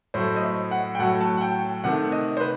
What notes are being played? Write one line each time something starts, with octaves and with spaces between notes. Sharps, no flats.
A2 F#3 A3 C5
D#5
E5
F#5
G5
A2 F#3 A3 F#5
A5
F#5
G5
C3 D#3 A3 F#5
D#5
C5
B4